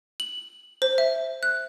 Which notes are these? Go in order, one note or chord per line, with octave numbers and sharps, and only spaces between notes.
F#7
C5
E5
F#6